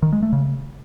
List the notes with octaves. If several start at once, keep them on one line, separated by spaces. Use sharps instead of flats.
D#3
G#3
A3
C#3